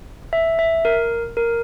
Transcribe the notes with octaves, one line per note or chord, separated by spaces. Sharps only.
E5
E5
A#4
A#4